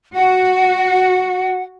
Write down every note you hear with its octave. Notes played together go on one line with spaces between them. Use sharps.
F#4 F#5